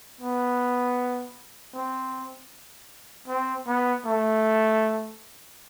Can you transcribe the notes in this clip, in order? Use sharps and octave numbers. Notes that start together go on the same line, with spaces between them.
B3
C4
C4
B3
A3